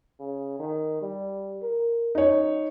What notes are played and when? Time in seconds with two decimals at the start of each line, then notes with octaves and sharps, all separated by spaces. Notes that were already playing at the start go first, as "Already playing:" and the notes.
0.20 C#3
0.59 D#3
1.02 G3
1.62 A#4
2.15 F#2 D#4 C#5